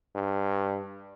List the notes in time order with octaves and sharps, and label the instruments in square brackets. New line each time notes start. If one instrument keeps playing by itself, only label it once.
[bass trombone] G2